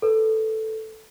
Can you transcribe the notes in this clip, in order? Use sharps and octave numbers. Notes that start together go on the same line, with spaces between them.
A4 B4